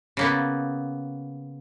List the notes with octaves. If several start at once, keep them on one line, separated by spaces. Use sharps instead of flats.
C#3 A#3 B3